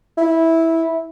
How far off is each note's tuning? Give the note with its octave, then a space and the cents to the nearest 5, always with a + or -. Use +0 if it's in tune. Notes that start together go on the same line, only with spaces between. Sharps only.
E4 -10